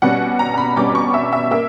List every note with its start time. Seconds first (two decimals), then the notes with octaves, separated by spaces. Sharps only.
0.02 B2 G3 C#4 F#5
0.39 A#5
0.54 A#5
0.58 B5
0.76 B2 G3 C#4 D6
0.95 C#6
1.14 E5
1.33 E5
1.51 A#3 E5